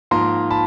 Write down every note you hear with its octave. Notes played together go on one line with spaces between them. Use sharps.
G#2 F3 A#3 A#5 C6
A5 B5